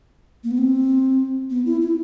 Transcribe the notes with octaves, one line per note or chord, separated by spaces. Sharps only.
A#3
B3
C4
B3
E4
E4